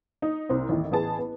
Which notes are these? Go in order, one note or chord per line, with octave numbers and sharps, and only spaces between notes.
D#4
C2 C4
A1 D#2 A2
A1 B3 G#4 A5
B3